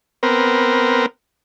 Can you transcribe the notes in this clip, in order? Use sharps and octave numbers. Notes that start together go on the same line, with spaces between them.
B3 C4 A#4